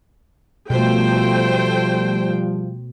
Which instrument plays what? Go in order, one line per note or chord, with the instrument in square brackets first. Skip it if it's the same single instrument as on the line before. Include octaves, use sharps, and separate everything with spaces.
[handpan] B2 [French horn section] F3 G3 [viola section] A3 C5 G5